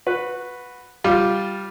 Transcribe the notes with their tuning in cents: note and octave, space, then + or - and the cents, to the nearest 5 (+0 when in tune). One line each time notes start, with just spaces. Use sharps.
F#4 -15 B4 +0
G3 -5 F4 +0